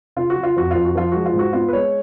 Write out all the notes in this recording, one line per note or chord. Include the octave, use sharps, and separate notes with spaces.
C#3 F4
F#4
F#3
F4
F2 F#4
F2 F4
F#4
F3 F4
G#3 F#4
F4
G#2
F#4
B3 F4
B4
G#3 C#5